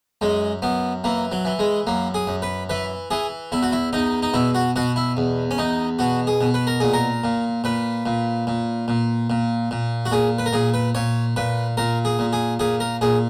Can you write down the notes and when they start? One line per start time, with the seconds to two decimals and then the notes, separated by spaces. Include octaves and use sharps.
0.21 F#2 G#3
0.62 F#2 B3
1.04 E3 A#3
1.32 F#3
1.45 E3
1.59 G#3
1.87 F#2 A#3
2.14 G#4
2.27 F#2
2.42 B4
2.69 E3 B4
3.11 E3 G#4
3.52 E2 E4
3.62 F#4
3.72 E4
3.93 E2 D#4
4.22 D#4
4.34 B2 E4
4.55 F#4
4.76 B2 F#4
4.96 E4
5.17 E2
5.51 C#4
5.58 E2 D#4
5.99 B2 F#4
6.27 G#4
6.41 B2
6.54 B4
6.67 A#4
6.80 A#2 G#4
6.93 A#4
7.24 A#2
7.64 A#2 B4
8.06 A#2
8.47 A#2
8.88 A#2
9.30 A#2
9.71 A#2
10.05 F#4
10.11 A#2 G#4
10.38 B4
10.46 A#4
10.53 A#2 G#4
10.74 B4
10.95 A#2 C#5
11.36 A#2 B4
11.77 A#2 A#4
12.05 G#4
12.19 A#2
12.33 G#4
12.59 A#2 G#4
12.80 A#4
13.01 A#2 G#4